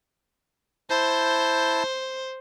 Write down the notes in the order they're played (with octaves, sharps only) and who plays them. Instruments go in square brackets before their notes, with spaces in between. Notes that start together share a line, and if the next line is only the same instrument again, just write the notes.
[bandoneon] E4 A5 G6 [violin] C5